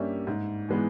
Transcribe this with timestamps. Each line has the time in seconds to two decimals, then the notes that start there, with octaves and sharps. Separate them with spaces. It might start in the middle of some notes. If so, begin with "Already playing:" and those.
Already playing: G2 G3 A#3 C#4 E5
0.27 G#2
0.69 E3 G#3 B3